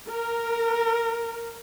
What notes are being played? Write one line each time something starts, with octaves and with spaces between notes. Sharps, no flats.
A#4